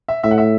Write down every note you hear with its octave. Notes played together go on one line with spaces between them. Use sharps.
E5
A2 E5
F#5
E5